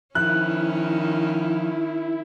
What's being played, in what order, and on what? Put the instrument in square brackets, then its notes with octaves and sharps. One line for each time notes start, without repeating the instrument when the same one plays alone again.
[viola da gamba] D#3 C#4 [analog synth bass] F3 [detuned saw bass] E4 [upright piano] F#6